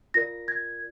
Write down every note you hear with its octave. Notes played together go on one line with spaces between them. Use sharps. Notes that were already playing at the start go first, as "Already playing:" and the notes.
F4 A#4 D5 A#6
G#6